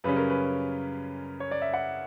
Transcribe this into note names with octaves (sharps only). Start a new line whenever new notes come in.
F#2 C#3 G3 C#4 B4
A#4
B4
C#5
D5
E5
F#5